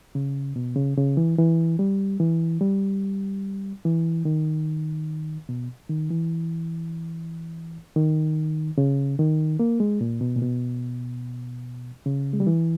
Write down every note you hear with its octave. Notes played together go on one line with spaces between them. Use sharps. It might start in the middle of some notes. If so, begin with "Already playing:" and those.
C#3
B2
C#3
C#3
E3
E3
G3
E3
G3
E3
D#3
B2
D#3
E3
D#3
C#3
D#3
A#3
G#3
A#2
B2
A#2
B2
C#3
G#3
G3
E3